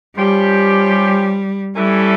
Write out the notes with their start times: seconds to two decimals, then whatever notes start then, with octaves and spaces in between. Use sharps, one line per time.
0.16 F3 G3 C#4 G4
1.76 E3 G3 A3 C#4 E4 A4